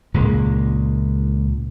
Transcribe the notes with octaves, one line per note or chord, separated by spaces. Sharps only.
C#2 A#2 G#3 A#3